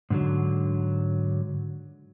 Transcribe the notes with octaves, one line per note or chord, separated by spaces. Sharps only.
G#2 D3 F#3